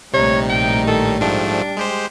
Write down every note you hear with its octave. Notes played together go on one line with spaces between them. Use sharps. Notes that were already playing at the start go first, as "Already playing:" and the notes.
A#1 A2 C3 G3 D#4 C#5
G5
D#3 A4
G#2 F3 A3 D4
G#3 G4 C5